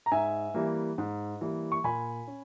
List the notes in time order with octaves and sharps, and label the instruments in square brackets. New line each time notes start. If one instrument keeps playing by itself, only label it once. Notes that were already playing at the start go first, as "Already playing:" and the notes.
[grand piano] A#5
G#2 E5 G#5
E3 G3 A#3
G#2
E3 G3 A#3
C#6
A#2 G#5 B5
C#4